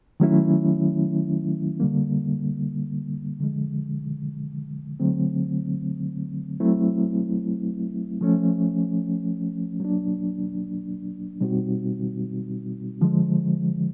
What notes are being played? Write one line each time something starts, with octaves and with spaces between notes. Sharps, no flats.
D#3 F#3 A3 C#4 E4
D3 G3 A#3
D3 F3 G#3
D3 F#3 A3 C4
F#3 A3 C4 E4
F3 A3 C#4
F#3 A#3 D4
B2 G3 C4 D#4 F#4
D3 F3 G#3